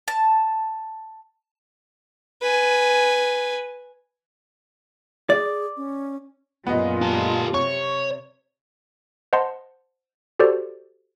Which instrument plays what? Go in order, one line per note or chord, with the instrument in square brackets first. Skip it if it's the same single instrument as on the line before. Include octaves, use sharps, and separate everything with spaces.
[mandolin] A5
[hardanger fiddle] B4 G#5
[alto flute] G#4 [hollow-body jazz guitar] D5
[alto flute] C#4
[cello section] F#2 A#2 G#3 [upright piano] B3 D#5 [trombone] F4
[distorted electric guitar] G4 A4
[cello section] C3 [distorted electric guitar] C#5 [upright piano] C#6
[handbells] C5 D#5 F#5 A5 C6
F#4 G4 A4 C5 D5